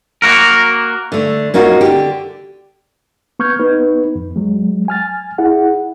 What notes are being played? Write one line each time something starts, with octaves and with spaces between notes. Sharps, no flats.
A#3 F#4 A#4
D3 A3
A#3 C#4 D#4 F4 F#4
D3 G4
B3 C#6 F6 G6 G#6
B3 D#4 B4
F2
F#3 G#3
G#5 F6 A6
E4 G#4 F#5